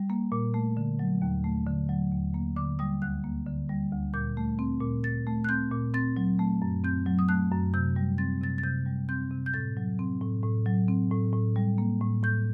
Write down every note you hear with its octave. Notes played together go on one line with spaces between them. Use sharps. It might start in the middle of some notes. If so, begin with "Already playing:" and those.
Already playing: G3
A#3
A#2
A3
D3
F#3
D#2
A3
D3
F#3
D#2
A#3
D3 D6
G3 D#6
D2 F#6
A#3
D3
G3
D2
A#2 G6
A3
C4
A#2
A#2 A6
A3
F#6
C4 G6
A#2
C4 A6
F#3
A3
F#2
C4 G6
F#3
D#6
A3 F#6
F#2
C3 G6
G3
C4 A6
C3 A6
A6
C3 G6
G3
C4 G6
C3
G6
A2 A6
F#3
C4
A2
A2
F#3
C4
A2
A2
G3
A#3
A2
A2 G6